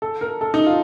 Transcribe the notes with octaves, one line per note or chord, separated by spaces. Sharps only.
A4
A#4
A4
D#4
F4